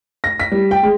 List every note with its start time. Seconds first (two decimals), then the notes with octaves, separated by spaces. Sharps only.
0.24 A#6
0.40 B6
0.52 G3
0.71 G5
0.83 G#3